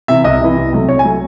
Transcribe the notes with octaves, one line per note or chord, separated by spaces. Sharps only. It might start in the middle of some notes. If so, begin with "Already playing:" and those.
C3 E3 E5
C2 D#5
C3 E3
C2
C3 F#3 A3
C2 C#5
G#5
C3 F#3 A3